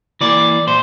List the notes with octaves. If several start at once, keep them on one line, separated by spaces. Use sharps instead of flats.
E3 A#3 D5
A#2 C5